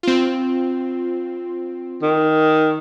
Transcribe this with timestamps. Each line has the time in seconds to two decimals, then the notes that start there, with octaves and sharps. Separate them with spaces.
0.03 C4 F4
2.02 D#3